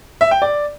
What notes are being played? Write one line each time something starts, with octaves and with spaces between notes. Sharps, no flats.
E5
G5
D5